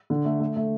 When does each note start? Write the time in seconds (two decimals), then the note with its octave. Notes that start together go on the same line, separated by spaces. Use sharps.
0.10 D3
0.25 A3
0.40 A3
0.56 A3